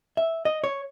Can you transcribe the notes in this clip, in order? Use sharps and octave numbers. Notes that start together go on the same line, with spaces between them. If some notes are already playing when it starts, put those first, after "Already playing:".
E5
D#5
C#5